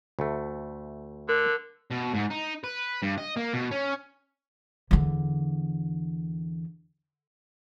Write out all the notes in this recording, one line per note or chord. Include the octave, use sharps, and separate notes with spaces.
D2 A3
D3 A#4
B2
G#2
D#4
B4
G2
D#5
A#3
B2
C#4
E2 D3